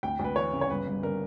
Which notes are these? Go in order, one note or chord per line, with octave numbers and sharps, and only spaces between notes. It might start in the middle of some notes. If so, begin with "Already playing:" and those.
D2 G5
D2
B4
E3 C#5
C#3
C#5
G1 B4
G1
D3 A#4